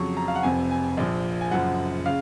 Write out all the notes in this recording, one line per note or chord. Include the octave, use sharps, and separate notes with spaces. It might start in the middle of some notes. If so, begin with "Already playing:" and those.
Already playing: F2 C#3 F#3 C#6
A#5
F5
F#5
F1 F2 C3 G#5
G#5
A#1 A#2 F3
G#5
F#1 F#2 F3 F#5
C#3 F5